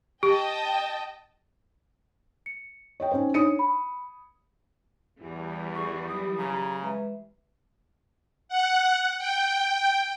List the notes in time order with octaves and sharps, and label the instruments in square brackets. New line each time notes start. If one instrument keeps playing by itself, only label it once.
[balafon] G4 [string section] D#5 G5 A5
[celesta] C#7
[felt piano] C#5 D#5 G5
C#4 D#4 C5
[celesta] D4 D#4 C#5 [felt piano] D#6 C#7 D#7
[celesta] B5
[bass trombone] E2 [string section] E3 G3
[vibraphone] G#4 [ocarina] C#6
[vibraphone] F#3 G4 B5 [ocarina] D#6
[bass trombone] C#3 [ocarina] A#5
[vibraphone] G#3 B4 E5
[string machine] F#5
G5